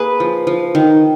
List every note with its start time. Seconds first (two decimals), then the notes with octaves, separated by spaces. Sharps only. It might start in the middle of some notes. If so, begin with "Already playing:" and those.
Already playing: A#3 G#4 B4
0.20 F3
0.47 F3
0.75 D#3